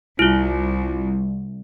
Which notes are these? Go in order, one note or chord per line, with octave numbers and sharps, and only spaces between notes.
C2 E4 F4